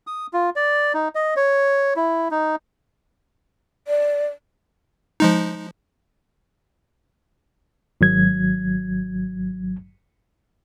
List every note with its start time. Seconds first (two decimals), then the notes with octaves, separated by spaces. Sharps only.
0.07 D#6
0.33 F4
0.56 D5
0.94 D#4
1.15 D#5
1.37 C#5
1.96 E4
2.31 D#4
3.88 D5
5.20 F3 G#3 D#4
8.01 G#1 F#3 G#6